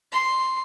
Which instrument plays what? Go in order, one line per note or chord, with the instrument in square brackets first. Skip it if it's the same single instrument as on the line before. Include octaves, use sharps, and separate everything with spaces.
[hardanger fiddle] C6